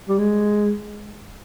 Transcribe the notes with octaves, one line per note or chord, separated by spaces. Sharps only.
G3
G#3